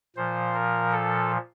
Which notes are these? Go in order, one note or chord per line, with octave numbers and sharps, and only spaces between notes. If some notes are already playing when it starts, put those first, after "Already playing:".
A#2 F3 C5
A#4
A4